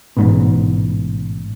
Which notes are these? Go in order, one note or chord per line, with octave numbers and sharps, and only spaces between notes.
A1 G#2 B2